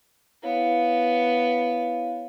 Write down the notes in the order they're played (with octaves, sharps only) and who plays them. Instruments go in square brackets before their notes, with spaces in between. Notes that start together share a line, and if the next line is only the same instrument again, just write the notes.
[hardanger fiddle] B3 [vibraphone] E4 C#5 F5